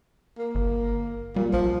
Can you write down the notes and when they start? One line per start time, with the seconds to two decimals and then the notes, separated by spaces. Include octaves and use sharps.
0.39 A#3
0.55 G1
1.36 A#2 G3
1.53 B1 F3